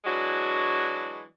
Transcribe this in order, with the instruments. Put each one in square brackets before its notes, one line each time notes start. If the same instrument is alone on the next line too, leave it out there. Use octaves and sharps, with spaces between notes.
[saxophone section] E3 F#3 G#3 D4 F#4